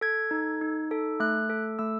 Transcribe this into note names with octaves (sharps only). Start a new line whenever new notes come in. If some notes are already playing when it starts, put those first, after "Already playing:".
A4 G#6
D#4
D#4
A4
A3 F#6
A4
A3 E6